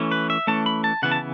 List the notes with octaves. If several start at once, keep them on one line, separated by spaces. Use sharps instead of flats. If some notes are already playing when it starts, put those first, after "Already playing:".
Already playing: E3 A3 C#4
B4
E5
E3 A3 C#4 A5
B5
A5
C#3 E3 B3 F#5
A5